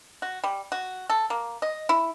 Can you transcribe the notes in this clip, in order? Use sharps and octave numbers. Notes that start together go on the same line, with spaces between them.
F#4
G3
F#4
A4
A#3
D#5
E4